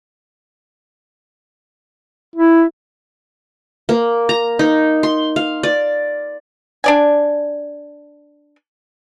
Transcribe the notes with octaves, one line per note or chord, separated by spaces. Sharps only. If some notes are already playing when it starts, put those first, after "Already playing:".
E4
A#3
A#5
D#4
C6
F5
D5
D4 D5 G#5